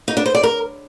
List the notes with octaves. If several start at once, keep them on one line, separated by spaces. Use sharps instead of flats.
D#4
D4
C5
D5
A#4